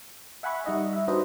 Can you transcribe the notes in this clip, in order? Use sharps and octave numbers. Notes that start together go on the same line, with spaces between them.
E5 F#5 G#5 B5 C#6
G3 D#4 D#5 E5
E5
D4 D#4 F#4 B4 C5 D#5